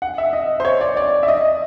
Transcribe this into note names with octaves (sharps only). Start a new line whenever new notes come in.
F#5
E5
D#5
C5
C#5
D5
D5
E5
D#5